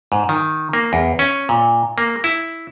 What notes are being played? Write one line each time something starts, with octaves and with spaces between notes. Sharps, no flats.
G#2
D#3
A#3
E2
C#4
A#2
A#3
E4